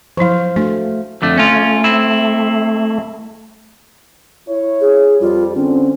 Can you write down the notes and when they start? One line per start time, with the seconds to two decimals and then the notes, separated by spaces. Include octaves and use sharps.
0.17 F3 F#3 E4 C5 F5
0.56 A3 D4 F#4 F5
1.22 F2 D3 A3
1.38 A3 C#4 F4
1.84 C4 E4
4.49 E4 C#5
4.81 G#4
5.21 F2 G3 F4
5.56 D3 C4 C#4